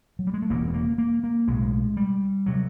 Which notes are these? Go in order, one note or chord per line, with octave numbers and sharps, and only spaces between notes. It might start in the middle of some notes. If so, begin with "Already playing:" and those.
F#3
G3
G#3
A3
E1 E2 C#3 A#3
B3
A#3
A#3
A#3
B1 A2 G#3
G3
C3 F#3